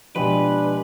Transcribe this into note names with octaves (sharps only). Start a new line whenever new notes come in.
B2 F3 G#3 D4 G4 B4